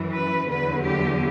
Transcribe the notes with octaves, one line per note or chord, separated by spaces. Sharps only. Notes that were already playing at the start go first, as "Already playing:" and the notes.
Already playing: F#2 E3
B4
E2 D3 F#3 B4
G4